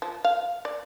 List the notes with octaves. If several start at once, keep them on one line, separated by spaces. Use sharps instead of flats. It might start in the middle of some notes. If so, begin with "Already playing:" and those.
F3
F5
D5